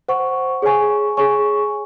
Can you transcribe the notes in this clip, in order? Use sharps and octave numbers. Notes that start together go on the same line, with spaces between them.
C5 F#5 C#6
G#4 C#5 G#5 C#6
G#4 C#5 G#5 C#6